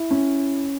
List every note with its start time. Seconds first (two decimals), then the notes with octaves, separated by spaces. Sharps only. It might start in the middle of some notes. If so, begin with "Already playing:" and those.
Already playing: E4
0.11 C#4